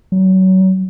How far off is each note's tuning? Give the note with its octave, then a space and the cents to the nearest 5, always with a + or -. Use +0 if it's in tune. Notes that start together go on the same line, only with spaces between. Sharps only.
F#3 +25